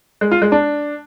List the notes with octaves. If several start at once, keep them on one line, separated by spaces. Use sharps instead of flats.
G#3
F4
G#3
D4